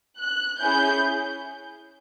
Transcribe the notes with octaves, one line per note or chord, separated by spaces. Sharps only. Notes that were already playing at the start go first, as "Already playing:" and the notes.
F#6
C#4 E4 G#4 G6